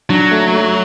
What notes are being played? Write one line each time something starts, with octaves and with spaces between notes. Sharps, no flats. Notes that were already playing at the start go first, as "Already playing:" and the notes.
F#3 D4
A3
A3